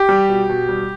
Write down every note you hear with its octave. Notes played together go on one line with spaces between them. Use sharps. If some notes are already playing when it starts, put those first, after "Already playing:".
Already playing: G4
G3
B2
B2
G3